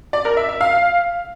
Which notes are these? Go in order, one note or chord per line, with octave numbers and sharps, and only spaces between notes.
D5
A#4
E5
E5
F5